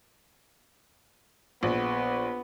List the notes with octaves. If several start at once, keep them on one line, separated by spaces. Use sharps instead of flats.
A#1 B3